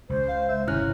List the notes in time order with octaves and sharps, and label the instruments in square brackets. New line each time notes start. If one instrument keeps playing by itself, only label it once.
[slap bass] C#2 C#3 [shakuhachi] C5
[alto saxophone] F5
E5
[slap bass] G1 C3 [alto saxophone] C#4 [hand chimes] E4 F6 F#6